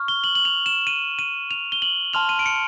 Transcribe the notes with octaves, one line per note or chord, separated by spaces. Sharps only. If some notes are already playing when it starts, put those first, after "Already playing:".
Already playing: C#6 F6
G7
F#7
F#7
F7
E7
D#7
D#7
F7
G7
F#7
A5 C6 F6 F7
D#7
D7
C#7